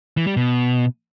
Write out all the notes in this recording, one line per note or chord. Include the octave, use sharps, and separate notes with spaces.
E3
G3
B2